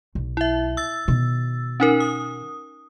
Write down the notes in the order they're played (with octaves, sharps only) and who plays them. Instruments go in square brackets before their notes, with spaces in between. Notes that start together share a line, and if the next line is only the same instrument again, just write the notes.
[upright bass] B1
[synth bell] E4 E5
E6 A6
[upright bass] B2 D#3
[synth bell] C#4 D#4 A#4
D#6